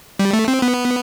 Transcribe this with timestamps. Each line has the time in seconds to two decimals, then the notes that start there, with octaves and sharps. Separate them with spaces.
0.19 G3
0.33 A3
0.48 C4
0.62 B3